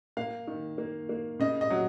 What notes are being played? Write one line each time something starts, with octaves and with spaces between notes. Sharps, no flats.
A#3 F5
D#3
A#3
A#3
C#3 D#5
D#5
F#3